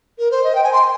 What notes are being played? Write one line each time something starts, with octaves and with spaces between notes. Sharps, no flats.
A#4
C5
D#5
G5
G#5
C6